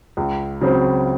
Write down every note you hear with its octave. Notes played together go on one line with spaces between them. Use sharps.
C#2
C#3 F#3 C4